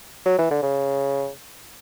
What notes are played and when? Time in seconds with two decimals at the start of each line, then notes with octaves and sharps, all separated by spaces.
0.26 F#3
0.38 E3
0.51 D3
0.62 C#3